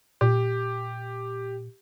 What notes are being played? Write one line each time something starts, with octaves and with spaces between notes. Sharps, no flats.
A#2 G4